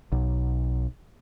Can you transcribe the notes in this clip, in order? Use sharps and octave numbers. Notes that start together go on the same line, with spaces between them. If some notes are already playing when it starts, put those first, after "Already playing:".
B1